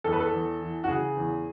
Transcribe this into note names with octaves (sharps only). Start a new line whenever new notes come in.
E2 A4
B4
A4
E2
E3
F#4
C#3 G#4
E2